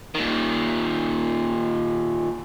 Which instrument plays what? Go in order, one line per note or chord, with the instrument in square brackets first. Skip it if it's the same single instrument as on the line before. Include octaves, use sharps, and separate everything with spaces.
[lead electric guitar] A#2 D#3